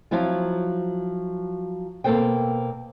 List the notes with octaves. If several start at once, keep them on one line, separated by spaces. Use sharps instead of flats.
F3 F#3 C4 E4 F4
B2 A#3 C4 A4 C5 G5